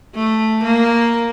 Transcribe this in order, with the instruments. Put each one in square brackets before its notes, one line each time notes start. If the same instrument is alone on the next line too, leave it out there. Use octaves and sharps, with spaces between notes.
[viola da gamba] A3
A#3